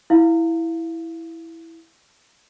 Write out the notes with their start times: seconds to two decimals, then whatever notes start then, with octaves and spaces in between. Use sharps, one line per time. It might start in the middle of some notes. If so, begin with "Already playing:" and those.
0.10 E4 F5